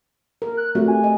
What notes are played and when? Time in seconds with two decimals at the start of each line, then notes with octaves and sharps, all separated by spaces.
0.42 A#4
0.57 F#6
0.75 A3 C4 F#4 G4
0.88 G#5
1.04 D#5